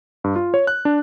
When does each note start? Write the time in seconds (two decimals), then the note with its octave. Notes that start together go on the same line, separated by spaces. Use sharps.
0.24 G2
0.36 F4
0.54 C#5
0.67 F#6
0.85 D4